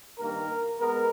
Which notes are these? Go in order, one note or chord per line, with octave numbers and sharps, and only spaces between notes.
G2 D#3 A#3 A#4
G#3 B3 A#4